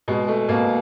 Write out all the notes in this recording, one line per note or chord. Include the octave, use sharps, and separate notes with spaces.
B2 G#3
A3
B2 A#3